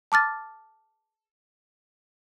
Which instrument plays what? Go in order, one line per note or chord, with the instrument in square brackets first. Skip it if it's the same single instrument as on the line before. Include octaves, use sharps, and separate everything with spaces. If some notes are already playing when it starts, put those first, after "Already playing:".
[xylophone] A5 D6 F6 A6